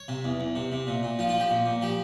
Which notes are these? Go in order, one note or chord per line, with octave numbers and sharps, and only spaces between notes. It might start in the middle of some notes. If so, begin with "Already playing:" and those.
Already playing: C#5
C3
E2
E2
C3
C3
A#2
A#2
F3 F4
F4
F3 G4
A#2
A#2
F3 G4